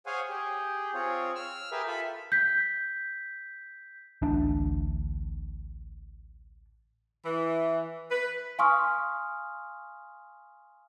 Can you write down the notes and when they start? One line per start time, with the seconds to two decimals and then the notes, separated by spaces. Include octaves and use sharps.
0.06 G#4 C5 C#5 F5 F#5 G#5
0.29 G4 G#4
0.94 C4 F4 G#4 C#5
1.35 E6 F6
1.72 G4 G#4 A#4 B4 E5
1.87 F4 A4 E5 B5
2.32 G6 B6
4.22 A1 D2 D4
7.25 E3
8.11 B4
8.59 F5 G#5 C6 C#6 D#6 F6